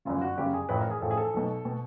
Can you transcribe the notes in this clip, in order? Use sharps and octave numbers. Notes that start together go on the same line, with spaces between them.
G1 F#2 C#3 F4
F#4
G1 F#2 C#3 G4
G#4
A1 A2 F3 B4
A#4
G#4
A1 A2 F3 A4
G#4
A4
B1 B2
B2